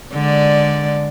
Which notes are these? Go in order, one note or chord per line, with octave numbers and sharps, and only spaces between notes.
D3 G#3 D5